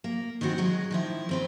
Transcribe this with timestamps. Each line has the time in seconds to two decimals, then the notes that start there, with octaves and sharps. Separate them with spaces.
0.04 A#3
0.41 D#3 E3 C4 F#4
0.58 F#3 G#3
0.91 D#3 F3 E4
1.29 D#2 C4 B4